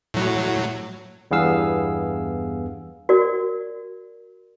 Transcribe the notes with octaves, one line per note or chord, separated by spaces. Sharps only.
A2 F#3
E2 G2 B3 G#4 F5 E6
F#4 A#4 D5